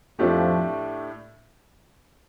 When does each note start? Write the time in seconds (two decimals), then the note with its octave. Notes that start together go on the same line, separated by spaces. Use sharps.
0.19 F2 A2 F3 A3 D4 G4